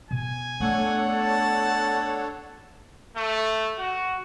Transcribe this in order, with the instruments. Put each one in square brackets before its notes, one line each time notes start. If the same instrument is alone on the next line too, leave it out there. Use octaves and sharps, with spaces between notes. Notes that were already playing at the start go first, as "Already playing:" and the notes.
[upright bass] B2 [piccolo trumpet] G#5
[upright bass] A3 B3 [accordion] D4 A4 C#5 [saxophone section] F#5
[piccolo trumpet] A5
[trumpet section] A3
F#4